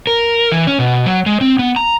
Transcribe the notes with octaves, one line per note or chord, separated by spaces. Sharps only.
A#4
E3
C#4
B2
F#3
G#3
C4
B3
A#5